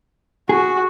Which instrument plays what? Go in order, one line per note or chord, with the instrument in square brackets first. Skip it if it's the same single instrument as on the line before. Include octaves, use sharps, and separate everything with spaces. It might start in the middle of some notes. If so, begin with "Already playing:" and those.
[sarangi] F#4 [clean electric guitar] G#4